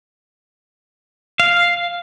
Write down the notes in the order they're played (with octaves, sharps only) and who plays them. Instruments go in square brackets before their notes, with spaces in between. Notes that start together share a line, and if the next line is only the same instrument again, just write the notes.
[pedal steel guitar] F5